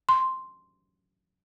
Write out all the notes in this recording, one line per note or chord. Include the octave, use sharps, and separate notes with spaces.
C6